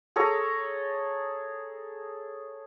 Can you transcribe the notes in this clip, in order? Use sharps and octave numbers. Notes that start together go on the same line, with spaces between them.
G#4 A4 C#5 A#5